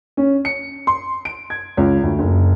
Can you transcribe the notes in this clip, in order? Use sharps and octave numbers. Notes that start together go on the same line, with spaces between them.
C#4
C#7
C6
D7
G#6
C#2
D2
F#1